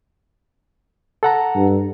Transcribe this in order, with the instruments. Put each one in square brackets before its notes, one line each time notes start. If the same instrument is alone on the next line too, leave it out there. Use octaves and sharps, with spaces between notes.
[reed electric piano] A4 F#5 A#5
[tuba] G2